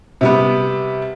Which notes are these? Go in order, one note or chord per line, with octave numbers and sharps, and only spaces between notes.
C3 G3 B3